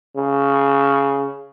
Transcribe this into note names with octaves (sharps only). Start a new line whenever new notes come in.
C#3